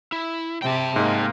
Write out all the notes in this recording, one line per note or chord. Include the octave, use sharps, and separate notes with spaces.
E4
C3 G4 G5 A5
G#2 G#3 A#3